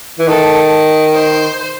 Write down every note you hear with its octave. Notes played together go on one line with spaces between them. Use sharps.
E3
D#3 A4
C5